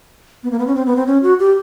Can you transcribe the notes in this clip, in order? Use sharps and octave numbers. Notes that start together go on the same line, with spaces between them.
B3
A#3
B3
C#4
C4
B3
C4
C#4
F#4
G4